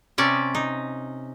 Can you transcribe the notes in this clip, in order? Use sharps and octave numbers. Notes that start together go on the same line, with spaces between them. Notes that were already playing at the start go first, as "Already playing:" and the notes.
C3 C#4 D5 E5
D#4